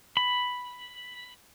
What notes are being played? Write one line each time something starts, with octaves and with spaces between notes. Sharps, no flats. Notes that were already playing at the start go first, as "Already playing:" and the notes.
B5